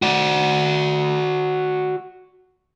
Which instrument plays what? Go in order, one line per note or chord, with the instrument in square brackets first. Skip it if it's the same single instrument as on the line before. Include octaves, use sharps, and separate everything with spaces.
[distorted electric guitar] F#4 D5